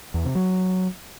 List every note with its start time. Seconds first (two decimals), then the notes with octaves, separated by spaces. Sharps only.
0.14 E2
0.25 C3
0.35 F#3